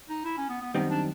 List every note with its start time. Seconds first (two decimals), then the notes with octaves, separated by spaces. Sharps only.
0.09 D#4
0.25 E4
0.38 C#4
0.49 B3
0.62 B3
0.74 F#2 D#3 G3 B3 C4 D#4
0.90 D4